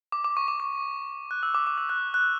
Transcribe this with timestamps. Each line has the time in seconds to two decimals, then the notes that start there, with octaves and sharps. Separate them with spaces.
0.12 D6
0.24 D6
0.37 C#6
0.48 D6
0.60 D6
1.31 F#6
1.43 E6
1.55 D6
1.67 D6
1.78 E6
1.89 F#6
2.14 F#6